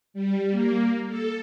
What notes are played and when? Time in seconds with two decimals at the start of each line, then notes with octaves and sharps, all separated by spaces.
0.14 G3
0.52 A#3
1.09 A4